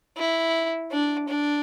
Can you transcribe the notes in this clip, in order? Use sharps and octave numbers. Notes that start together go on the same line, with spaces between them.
E4
D4
D4